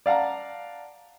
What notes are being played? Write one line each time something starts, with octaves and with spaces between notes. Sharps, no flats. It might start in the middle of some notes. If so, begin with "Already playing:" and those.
D5 F5 F#5 A5 A#5